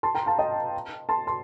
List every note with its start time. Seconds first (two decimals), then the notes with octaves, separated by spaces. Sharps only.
0.03 A5 C6
0.15 G5 A#5
0.26 F5 A5
0.39 D#5 G5
1.09 A5 C6
1.27 A5 C6